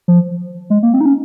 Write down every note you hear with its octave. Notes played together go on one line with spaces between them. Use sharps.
F3
G#3
A#3
C4
D#4
C#4